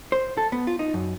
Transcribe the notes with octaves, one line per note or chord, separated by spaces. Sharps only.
C5
A4
B3
F4
D#4
F#2